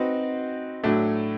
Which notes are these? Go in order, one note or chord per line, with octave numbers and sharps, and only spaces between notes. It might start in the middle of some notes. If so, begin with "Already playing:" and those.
Already playing: C4 D#4 F#4 B4
A2 F#3 A3 D4